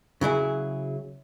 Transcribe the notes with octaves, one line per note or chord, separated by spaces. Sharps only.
C#3 F#3 E4 G#4